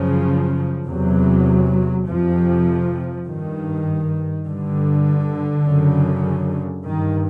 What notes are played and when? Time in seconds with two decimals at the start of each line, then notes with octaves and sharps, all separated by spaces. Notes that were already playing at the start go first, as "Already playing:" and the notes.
Already playing: F#2 C#3 F3
0.87 E2 C3 F#3
2.06 F2 C3 F3
3.27 G2 D#3
4.46 G2 D3
5.65 F#2 C#3
6.85 G2 D#3